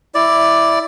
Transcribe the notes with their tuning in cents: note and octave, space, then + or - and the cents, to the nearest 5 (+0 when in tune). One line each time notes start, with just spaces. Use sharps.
E4 +0 D5 +0